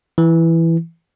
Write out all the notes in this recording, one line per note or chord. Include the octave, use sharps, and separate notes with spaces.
E3